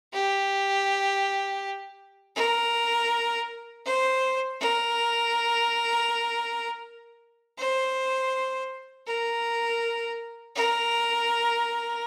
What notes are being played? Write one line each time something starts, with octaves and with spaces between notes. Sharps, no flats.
G4
A#4
C5
A#4
C5
A#4
A#4